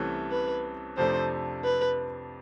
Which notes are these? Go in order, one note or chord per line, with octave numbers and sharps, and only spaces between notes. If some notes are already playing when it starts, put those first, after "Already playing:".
Already playing: C2 C3 E3 A3 C#4
B4
F2 C3 F3 A3 D4 C5
B4